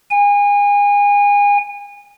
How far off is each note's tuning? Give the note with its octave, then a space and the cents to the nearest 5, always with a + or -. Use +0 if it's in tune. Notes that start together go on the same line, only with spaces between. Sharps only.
G#5 -30